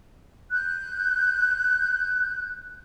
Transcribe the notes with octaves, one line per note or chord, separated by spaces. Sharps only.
F#6 G6